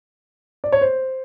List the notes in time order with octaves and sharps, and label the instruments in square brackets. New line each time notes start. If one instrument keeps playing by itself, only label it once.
[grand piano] D5
C#5
C5